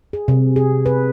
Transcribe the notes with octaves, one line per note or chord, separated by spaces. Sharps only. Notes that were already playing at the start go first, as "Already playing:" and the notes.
G#4
C3
G#4
B4